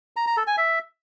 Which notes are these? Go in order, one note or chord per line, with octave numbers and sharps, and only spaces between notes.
A#5
A#5
A4
G#5
E5